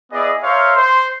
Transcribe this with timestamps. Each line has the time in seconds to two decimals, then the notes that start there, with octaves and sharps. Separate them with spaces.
0.13 B3 E4 G#4 D5 D#5
0.43 A#4 C5 C#5 E5 F5
0.76 C5 C6